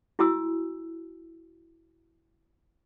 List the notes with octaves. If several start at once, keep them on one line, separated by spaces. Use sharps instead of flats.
E4 F#4 G#5 D#6 E6